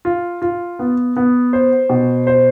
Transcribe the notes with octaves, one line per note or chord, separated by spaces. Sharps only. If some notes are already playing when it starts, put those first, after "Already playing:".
F4
F4
B3
B3
C5
B2
C5